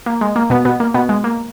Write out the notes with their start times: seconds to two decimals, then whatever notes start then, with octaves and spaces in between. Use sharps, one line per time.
0.06 A#3
0.21 G#3
0.36 A#3
0.50 B2 B3
0.65 B2 B3
0.80 A#3
0.94 B2 B3
1.09 G#3
1.24 A#3